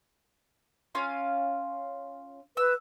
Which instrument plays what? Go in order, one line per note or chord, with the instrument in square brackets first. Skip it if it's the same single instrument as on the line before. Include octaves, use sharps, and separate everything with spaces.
[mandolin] C#4 F4 F5
[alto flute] B4 [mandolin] E6